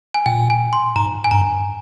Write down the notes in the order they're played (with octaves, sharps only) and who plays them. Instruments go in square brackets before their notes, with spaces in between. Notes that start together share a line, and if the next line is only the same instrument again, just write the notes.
[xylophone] G#5
[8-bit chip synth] A#2 [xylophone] G5
[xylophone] G#5
C6
[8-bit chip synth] G#2 [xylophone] A#5
[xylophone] G#5
[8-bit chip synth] G2 [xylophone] A#5